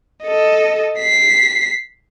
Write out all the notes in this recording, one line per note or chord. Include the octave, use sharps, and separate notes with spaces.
A4 D#5
B6 C7